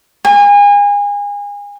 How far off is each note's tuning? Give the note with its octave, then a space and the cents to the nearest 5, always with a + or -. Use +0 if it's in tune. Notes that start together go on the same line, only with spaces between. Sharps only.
G#5 -30